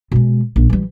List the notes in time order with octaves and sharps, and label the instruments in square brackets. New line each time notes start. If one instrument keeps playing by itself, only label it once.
[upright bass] B2 G#3
A#1
E3 G3